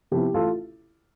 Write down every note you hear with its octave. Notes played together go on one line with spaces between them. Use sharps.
C3 F3 B3 E4 G4
A1 F4 A4